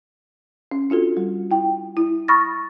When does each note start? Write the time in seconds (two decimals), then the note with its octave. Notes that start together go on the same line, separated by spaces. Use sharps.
0.72 C#4
0.90 D4 F4 F#4 A4
1.17 G3
1.51 E4 G5
1.97 E4
2.28 B5 C#6 D#6 F6 A6 A#6